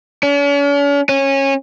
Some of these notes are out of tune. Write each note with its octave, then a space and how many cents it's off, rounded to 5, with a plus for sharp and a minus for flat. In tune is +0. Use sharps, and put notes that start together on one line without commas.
C#4 +45
C#4 -20